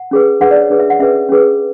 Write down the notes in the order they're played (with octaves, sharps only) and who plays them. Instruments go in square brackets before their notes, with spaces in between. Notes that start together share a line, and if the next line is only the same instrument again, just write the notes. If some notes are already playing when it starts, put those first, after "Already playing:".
Already playing: [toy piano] F#5
C#4 G#4 B4
D4 G#4 B4 F#5
D5
C#5
D4 G#4 B4
E5
F#5
C#4 G#4 B4 E5
C#4 G#4 B4